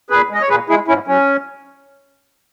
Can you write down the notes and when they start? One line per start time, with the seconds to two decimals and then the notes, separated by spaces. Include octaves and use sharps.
0.10 A#2 G#4 B4
0.29 G#3 D#5
0.41 C#5
0.49 A#2 G#4 B4
0.69 G#3 E4 G#4
0.88 G#2 C#4 E4
1.08 F#3 C#4